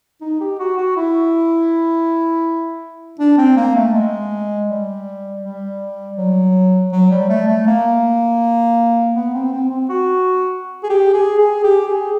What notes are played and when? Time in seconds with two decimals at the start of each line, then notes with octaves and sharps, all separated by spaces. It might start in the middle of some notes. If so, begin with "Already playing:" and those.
0.21 D#4
0.41 G4
0.59 F#4
0.77 F#4
0.96 E4
3.20 D4
3.38 C4
3.57 A#3
3.76 A3
3.94 G#3
4.69 G3
5.43 G3
6.18 F#3
6.92 F#3
7.11 G3
7.29 A3
7.48 A3
7.67 A#3
9.16 B3
9.34 C4
9.53 C4
9.71 C4
9.89 F#4
10.83 G#4
10.90 G4
11.14 G#4
11.39 G#4
11.64 G4
11.89 G#4